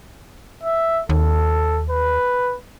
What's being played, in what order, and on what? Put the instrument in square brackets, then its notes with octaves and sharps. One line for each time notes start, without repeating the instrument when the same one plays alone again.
[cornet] E5
[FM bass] D#2 [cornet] A4
[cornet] B4